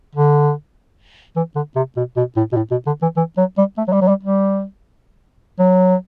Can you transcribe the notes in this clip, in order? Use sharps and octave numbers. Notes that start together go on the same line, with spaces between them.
D3
E3
D3
C3
B2
B2
A2
B2
A2
B2
D3
E3
E3
F#3
G3
A3
F#3
G3
F#3
G3
G3
F#3